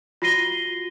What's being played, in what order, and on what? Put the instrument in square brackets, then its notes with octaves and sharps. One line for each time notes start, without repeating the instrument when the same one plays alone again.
[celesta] F4 F#4 A#6 C7 D#7 G7